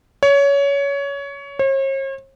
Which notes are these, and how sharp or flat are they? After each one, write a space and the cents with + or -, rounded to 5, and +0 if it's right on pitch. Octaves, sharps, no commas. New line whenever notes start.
C#5 +20
C#5 -45